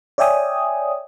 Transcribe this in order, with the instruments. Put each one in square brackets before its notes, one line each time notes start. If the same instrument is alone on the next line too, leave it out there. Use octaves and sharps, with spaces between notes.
[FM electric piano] C#5 D5 E5 G5 G#5 D#6